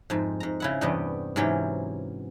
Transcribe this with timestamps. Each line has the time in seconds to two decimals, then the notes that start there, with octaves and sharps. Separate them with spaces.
0.10 F2 G#2
0.40 G#2 A#5
0.60 C#3 E4 F#5
0.81 E2 G2 C3 G3 B3 D#5
1.36 G#2 C3 E3 F#3 C#4 G4